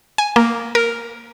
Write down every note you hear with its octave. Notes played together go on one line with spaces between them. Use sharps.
G#5
A#3
A#4